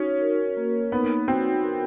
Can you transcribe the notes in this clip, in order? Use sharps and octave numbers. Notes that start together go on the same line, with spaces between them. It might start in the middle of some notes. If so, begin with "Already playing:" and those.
Already playing: C#4 D#4 F#4
A#4
A#3
B3 D#4
C4 F#4
A#4